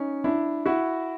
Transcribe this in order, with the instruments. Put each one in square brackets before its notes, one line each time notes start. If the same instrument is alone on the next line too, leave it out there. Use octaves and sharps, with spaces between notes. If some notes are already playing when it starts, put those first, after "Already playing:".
Already playing: [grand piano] C#4 D#4
D4 E4
E4 F#4